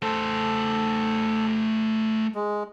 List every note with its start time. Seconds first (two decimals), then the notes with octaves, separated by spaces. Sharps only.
0.02 A3 A4 C5
2.35 G#3